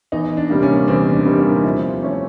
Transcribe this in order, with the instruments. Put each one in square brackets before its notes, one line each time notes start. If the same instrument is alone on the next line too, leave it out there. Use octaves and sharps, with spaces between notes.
[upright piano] E2 [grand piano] D#4
[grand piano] D4
[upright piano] C3 D#3 G3 A#3
[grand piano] C#4
[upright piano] E2 [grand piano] C4
[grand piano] D4
[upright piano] C3 D#3 G3 A#3
[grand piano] D#4
[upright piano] F3 [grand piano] E4
[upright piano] A3 C#4